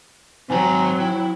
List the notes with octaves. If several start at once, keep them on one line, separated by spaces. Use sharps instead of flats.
G#2 D#3 F#3 C4 G#5 A#5
E4 G5